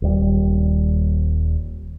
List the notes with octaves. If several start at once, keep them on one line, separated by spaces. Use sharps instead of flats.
D#1 G3